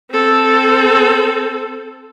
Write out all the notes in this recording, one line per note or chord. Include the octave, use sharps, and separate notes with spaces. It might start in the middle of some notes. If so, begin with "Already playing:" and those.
C4 A4